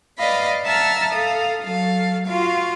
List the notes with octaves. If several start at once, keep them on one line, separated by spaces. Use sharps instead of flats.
B4 D5 D#5 F5 B5
E5 F#5 A5 A#5 E6 F6
A4 F5 D#6
F#3 A4 F5
F4 F#4 F5